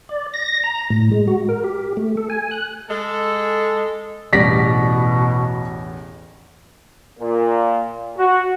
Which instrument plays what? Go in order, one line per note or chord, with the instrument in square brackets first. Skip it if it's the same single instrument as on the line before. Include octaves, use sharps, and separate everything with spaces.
[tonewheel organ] D5
A#6
A#5
A2
G#3
F#4
A#4
G4
A3
A4
G#5
F#6
[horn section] G#3 A4
[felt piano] A1 E2 [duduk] B2 [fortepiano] G3 D5 [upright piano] A#6 B6
[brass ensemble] A#2
F#4